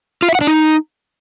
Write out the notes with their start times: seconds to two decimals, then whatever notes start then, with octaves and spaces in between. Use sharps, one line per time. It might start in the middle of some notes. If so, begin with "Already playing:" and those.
0.22 F4
0.29 E5
0.35 F#5
0.41 D4
0.47 D#4